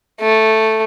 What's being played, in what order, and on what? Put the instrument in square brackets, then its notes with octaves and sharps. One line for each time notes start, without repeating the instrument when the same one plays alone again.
[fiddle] A3